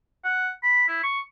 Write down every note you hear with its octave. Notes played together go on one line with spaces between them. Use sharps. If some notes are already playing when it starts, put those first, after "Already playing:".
F#5
B5
E4
C#6